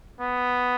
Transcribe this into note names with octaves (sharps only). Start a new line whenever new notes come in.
B3